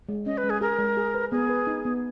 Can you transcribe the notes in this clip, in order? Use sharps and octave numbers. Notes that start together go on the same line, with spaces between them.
G#3
C#4 D#5
B4
G#3
G#4
G#4 A#4
G#3
G#4
B4
B3 G#4
B4
D#4
B3